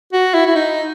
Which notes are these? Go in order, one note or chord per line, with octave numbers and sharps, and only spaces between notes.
F#4
E4
E4
D#4